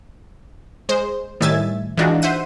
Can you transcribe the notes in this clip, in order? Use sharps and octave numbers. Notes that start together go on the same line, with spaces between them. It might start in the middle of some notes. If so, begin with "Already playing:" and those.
G#3 C5
A2 D#3 G3 E5 G#5 A6
E3 G#3 D4 D#4 F4 F#4
C5 E5 F#5 D#7